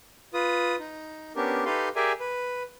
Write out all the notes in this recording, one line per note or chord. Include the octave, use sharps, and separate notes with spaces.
F4 B4 D#6
D#4
B3 C#4 D4 G4 A#4
D#4 G4 A4 B4 F5 C6
G4 G#4 A#4 D5 E5 G#5
B4